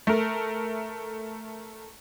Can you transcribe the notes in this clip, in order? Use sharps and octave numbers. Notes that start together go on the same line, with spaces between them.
A3 A#4